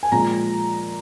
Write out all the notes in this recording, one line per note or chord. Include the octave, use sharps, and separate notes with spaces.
G#5
A#2 F3 G#3 A#5